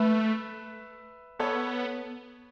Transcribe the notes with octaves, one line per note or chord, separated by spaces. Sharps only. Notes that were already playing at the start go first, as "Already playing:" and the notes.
Already playing: A3 B4 E5
B3 A4 C#5